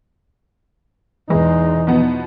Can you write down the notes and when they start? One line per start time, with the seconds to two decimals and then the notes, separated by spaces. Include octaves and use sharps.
1.30 E2 E3 G#3 D#4
1.87 B2 F3 B3